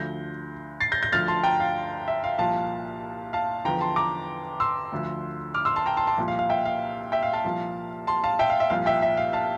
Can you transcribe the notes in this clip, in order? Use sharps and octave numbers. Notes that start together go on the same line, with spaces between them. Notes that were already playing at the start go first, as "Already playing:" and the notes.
Already playing: D2 D3 F3 G6 A#6
A6 C7
G6 A#6
G6 A#6
D2 D3 F3 F6 A6
A5 C6
G5 A#5
F5
E5
F5
C2 A#2 F3 F5 A5
F5 A5
E2 D3 F3 G5 A#5
A5 C6
A#5 D6
C6 E6
D2 D3 F3
D6 F6
C6 E6
A5 C6
G5 A#5
A5 C6
A5 C6
C2 A#2 F3
F5
F5
E5 G5
F5
E5 G5
F5
F5 A5
C2 A#2 F3
A5 C6
F5 A5
E5 G5
F5
E5
C2 A#2 F3 F5
E5 G5
E5
F5
F5 A5